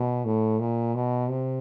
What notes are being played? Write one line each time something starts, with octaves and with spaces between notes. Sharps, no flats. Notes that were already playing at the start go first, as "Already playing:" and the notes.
Already playing: B2
A2
A#2
B2
C3